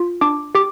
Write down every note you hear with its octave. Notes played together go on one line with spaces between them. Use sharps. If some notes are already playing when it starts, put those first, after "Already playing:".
Already playing: F4
D4 D6
G4 D6